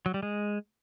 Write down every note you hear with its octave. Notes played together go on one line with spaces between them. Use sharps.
F#3
G3
G#3